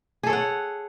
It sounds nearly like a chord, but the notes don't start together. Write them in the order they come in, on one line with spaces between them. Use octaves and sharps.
G#4 A4 C#5 F#5